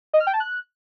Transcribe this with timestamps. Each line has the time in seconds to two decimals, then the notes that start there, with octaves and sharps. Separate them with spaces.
0.13 D#5
0.20 F6
0.27 G5
0.33 A5
0.40 F#6